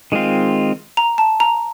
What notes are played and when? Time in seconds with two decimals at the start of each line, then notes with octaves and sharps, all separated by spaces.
0.12 D#3 G#3 C4 F4
0.97 A#5
1.18 A5
1.40 A#5